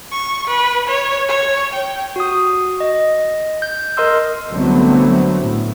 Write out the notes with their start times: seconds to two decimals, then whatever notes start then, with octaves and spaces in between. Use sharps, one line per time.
0.11 C#6
0.47 B4
0.87 C#5
1.28 C#5
1.73 G5
2.16 F#4 D#6
2.80 D#5
3.62 G6
3.97 A#4 D#5 C6 E6
4.49 C2 D3 F#3 A3 B3 C4
5.39 A2